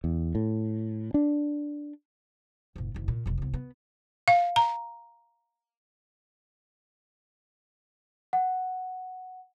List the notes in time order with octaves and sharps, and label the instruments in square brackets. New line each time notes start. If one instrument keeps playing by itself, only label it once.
[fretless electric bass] E2
A2
D4
[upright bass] F#1 A#2
F#1 D#3
A#2
F1 B1
C2 B3
B3
[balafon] F5
A#5
[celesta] F#5